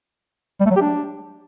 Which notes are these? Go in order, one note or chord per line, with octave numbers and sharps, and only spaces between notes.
G3
A3
F#3
G4
D4